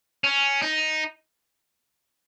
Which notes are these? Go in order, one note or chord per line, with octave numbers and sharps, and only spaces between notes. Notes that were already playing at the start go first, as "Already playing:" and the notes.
C#4
D#4